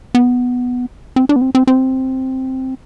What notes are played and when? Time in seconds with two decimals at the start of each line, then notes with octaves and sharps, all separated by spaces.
0.15 B3
1.16 C4
1.29 D4
1.36 B3
1.41 C4
1.55 C4
1.67 C4